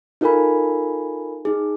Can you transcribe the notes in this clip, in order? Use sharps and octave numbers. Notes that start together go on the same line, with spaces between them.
D#4 F4 A4 A#4 G#5 B5
D#4 G#4